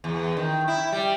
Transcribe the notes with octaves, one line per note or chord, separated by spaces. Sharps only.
E2
D#3
E4
G3